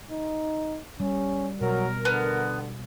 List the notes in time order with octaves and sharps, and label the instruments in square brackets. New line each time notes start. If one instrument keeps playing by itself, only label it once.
[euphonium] D#4
[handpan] G3 [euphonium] C#4
[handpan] B2 [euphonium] F#3 [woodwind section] A#4
[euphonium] D3 [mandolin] B3